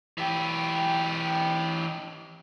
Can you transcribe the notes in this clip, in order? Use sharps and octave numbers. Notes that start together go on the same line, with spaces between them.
E3 G4